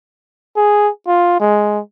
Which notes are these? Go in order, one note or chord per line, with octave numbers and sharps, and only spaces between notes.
G#4
F4
G#3